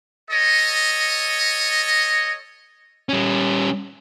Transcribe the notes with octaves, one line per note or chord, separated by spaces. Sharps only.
A4 C#5 D#5
G3 C#4